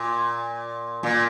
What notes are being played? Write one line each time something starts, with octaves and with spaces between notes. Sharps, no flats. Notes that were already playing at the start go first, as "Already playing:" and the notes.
Already playing: A#2
A#2